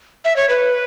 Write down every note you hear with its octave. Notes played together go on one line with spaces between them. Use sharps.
E5
C#5
B4